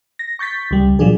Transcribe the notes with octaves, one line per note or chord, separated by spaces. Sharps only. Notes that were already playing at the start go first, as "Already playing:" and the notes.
A#6
C#6 G6 A6 B6
C#2 G3
A#2 F3 F#3 D4 G#4